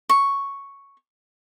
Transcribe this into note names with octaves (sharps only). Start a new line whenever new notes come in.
C#6